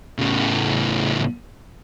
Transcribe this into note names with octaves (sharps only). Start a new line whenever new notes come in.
A2 C#3